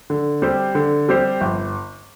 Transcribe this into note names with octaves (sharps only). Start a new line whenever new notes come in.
D3
G3 C4 G4 C5
D3
G3 C4 G4 C5
G1